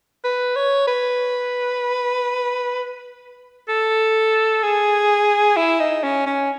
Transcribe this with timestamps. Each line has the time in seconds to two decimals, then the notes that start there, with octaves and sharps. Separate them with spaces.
0.24 B4
0.56 C#5
0.87 B4
3.68 A4
4.63 G#4
5.56 E4
5.80 D#4
6.03 C#4
6.26 C#4